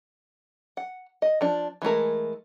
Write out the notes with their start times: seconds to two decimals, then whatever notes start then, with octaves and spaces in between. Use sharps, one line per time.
0.77 F#5
1.22 D#5
1.41 F3 D4
1.82 E3 G#3 A3 A#4